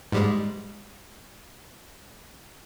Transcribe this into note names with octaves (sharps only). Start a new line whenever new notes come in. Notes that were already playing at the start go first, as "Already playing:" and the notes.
G#2 G3 G#3